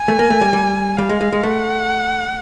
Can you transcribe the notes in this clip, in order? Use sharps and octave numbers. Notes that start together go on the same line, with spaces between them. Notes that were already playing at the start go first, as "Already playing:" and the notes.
Already playing: G#5
A3
A#3
A3
G3
G3
G3 F5
G#3
G#3
G#3
A3 F#5